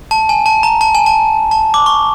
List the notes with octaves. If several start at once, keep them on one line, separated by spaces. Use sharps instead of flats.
A5
G#5
A5
A#5
A5
G#5
A5
A5
D6
C#6